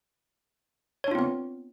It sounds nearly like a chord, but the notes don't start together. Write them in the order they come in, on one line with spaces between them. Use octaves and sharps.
C#5 D4 F4 C4 B3